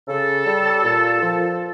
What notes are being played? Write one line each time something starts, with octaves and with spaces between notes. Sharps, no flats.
C#3 A4
G3
A#2
F3